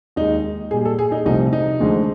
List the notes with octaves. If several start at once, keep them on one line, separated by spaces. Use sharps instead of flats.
D#2 D#3 G#3 D#4
A#2 G3 G#4
A4
G#4
D#4
C2 C3 F3 A3 D#4
D#4
D2 D3 F3 G#3